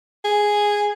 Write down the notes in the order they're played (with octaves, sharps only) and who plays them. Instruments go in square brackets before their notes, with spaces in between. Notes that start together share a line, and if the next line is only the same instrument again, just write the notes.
[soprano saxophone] G#4